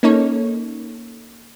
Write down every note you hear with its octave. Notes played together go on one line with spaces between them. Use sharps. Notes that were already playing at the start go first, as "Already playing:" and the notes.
A#3 C#4 D#4 A4 C#5